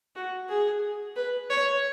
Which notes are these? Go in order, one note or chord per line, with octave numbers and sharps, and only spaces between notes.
F#4
G#4
B4
C#5